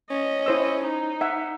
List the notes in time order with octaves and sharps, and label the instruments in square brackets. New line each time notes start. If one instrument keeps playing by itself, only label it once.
[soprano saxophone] C#4 [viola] D#5
[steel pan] E4 C5 E6
[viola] D#4
[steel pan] E5 F#5